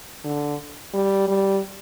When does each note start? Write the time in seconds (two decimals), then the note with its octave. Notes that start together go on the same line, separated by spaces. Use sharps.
0.24 D3
0.94 G3
1.28 G3